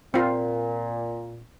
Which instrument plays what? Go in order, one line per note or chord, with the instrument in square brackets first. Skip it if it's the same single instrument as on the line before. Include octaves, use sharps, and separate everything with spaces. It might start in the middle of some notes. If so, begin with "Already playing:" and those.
[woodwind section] A#2 [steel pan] C4 F4